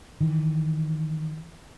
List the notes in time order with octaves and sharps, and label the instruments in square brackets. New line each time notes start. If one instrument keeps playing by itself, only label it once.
[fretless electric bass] D#3 E3